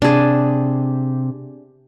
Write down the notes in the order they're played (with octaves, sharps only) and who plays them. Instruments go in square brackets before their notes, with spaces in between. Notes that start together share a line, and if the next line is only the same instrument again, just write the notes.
[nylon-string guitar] C3 [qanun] D4 G#4